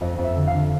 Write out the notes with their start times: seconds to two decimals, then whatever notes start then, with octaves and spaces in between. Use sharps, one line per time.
0.01 F2 D#5
0.18 F2
0.24 E5
0.36 D3
0.47 F5
0.53 D3